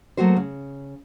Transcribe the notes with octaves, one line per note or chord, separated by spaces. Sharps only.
F#3 A3 A#3 F#4 C5
C#3